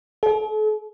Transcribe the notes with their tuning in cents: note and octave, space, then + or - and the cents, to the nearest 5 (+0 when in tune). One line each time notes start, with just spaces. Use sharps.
A4 -40